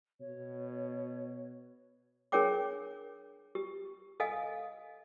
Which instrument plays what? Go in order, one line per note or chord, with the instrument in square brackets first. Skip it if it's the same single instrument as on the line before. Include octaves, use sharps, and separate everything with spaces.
[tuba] B2 [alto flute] C#5
[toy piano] D4 G#4 A#4 C#5 G5 D6
G4
A4 D#5 F5 G#5 D#6